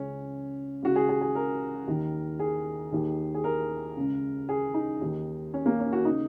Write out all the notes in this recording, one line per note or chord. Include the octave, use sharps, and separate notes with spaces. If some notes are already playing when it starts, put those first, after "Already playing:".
Already playing: C#2 C#3 C#4
C#2 C#3 F#4
G#4
G#4
G#4
A#4
D#2 D#3
G#4
D#2 D#3
G#4
A#4
C#2 C#3
G#4
D#4
D#2 D#3
C#4
A#3
C#4
F#4
C#3 D#4